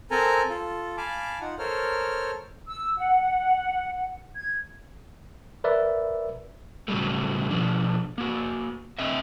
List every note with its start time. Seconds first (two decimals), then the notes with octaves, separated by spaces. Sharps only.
0.11 C4 A4 A#4 G#5 A#5
0.50 F4 A4
0.97 F5 G#5 A5 B5 D6
1.41 D#4 F4 F#5
1.59 A4 A#4 C5 C#5 F6
2.66 E6
2.97 F#5
4.36 G#6
5.64 A#4 B4 D5 E5
6.88 A2 C#3 F#3 G3 A3
7.50 B2 F3 D4
8.18 A#3 F#4
8.99 C4 D#5 E5